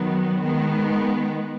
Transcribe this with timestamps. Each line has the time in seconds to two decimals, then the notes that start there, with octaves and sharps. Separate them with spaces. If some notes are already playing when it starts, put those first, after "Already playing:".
Already playing: D#3 F#3 B3
0.41 D#3 G#3 B3